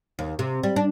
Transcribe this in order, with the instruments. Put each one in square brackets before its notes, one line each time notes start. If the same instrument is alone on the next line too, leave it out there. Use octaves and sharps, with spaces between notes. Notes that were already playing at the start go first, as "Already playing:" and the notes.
[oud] D#2
C3
G3
D4